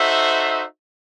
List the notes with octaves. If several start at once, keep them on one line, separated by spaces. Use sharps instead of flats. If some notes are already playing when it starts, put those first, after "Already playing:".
Already playing: D#4 F#4 A4 C5 E5